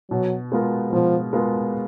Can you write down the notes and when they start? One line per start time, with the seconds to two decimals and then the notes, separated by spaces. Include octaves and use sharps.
0.11 B2 F#3
0.52 G#3 B3 F4 A#4
0.92 B2 F3
1.33 G#3 B3 F4 A#4